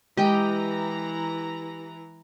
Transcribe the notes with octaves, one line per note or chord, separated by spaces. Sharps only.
E3 G#3 G4 D#5 G5 A#5